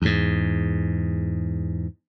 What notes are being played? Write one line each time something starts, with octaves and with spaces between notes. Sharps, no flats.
E2 G#2